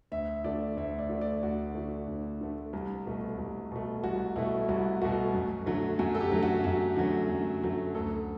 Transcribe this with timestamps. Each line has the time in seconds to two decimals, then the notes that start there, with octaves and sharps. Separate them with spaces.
0.12 D2 E5
0.44 D3 A3 D5
0.77 D2 E5
0.99 D5
1.09 D3 A3
1.21 D5
1.43 D2 F#4
1.75 D3 A3
2.07 D2
2.41 D3 A3
2.73 C2
3.06 B2 A3
3.38 C2
3.72 B2 A3
4.04 C2 F#4
4.36 B2 A3 E4
4.68 C2 F#4
5.02 B2 A3 F#4
5.34 F#2
5.66 D3 F#3 A3
5.99 F#2 F#4
6.15 A4
6.21 G4
6.32 D3 F#3 A3
6.43 F#4
6.64 F#2 F#4
6.96 D3 F#3 A3
7.29 F#2
7.62 D3 F#3 A3
7.95 D2 A4